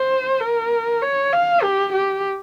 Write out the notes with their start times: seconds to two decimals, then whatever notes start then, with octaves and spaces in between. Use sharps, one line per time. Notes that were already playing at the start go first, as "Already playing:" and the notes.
Already playing: C5
0.40 A#4
1.02 C#5
1.32 F5
1.63 G4
1.93 G4